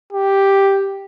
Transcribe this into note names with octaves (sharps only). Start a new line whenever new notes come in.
G4